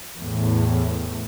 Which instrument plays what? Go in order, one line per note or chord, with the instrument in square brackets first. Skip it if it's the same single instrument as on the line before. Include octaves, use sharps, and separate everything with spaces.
[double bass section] E2 A2